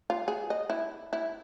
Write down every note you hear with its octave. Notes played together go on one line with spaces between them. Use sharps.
F4
G#4
D#5
E4
E4